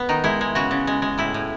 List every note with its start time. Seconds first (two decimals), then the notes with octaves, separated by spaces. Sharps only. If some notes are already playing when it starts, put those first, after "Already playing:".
Already playing: B3
0.09 D#3 D#4
0.24 G#3 E4
0.41 G#3
0.55 C#3 F#4
0.71 C#3
0.87 G#3
1.02 G#3
1.18 A2 E4
1.34 A2